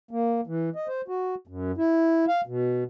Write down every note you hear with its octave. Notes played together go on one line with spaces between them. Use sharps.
A#3
E3
D#5
C5
F#4
F#2
E4
F5
B2